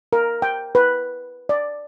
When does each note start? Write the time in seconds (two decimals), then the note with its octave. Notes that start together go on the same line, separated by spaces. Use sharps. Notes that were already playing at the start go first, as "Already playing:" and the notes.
0.13 A#4
0.42 G5
0.75 B4
1.49 D5